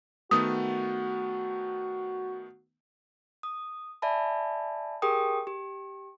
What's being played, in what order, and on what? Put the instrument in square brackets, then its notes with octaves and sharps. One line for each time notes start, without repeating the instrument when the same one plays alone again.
[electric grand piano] D#3 A3 B3 [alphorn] F#4 [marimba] D#6
[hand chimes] D#6
D5 E5 G#5 A5 B5
G4 G#4 A#4 G5 D#6
G4